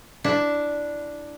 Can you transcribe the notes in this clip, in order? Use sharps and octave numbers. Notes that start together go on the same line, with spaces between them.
D4 E4